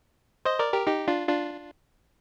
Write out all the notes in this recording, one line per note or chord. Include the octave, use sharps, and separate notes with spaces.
C5 D#5
A#4 D5
G4 A#4
D#4 G4
D4 F4
D4 F4